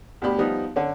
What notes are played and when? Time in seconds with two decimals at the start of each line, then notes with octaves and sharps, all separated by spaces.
0.22 D2 B2 D4 G4 B5
0.38 F3 G3 B3 D#4
0.76 D3 C#4